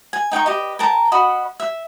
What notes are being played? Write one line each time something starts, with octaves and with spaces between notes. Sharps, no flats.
G#5
D#4 G5 A#5 C#6
G4 B4 D#5
A#4 G5 A5 A#5
F#4 D#5 B5
E5